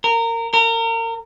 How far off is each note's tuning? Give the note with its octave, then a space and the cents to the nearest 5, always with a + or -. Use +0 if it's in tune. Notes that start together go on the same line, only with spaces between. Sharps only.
A#4 -20
A#4 -30